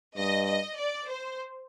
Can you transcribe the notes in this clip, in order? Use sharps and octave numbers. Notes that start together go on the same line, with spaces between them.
G2 D#5
D#5
D5
C5